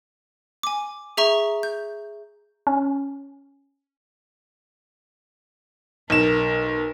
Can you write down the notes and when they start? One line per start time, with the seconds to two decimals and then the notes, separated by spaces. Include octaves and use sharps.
0.63 G#5 D6
1.17 G#4 E5 A#5 C#6
1.63 G6
2.67 C#4
6.10 B1 A#4 E7